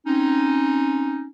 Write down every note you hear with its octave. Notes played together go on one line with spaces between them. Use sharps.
C4 C#4 D#4